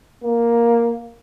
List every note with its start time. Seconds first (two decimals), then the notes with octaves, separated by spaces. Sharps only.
0.24 A#3